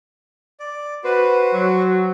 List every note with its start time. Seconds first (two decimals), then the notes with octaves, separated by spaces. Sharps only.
0.60 D5
1.04 F#4 B4 C5
1.54 F#3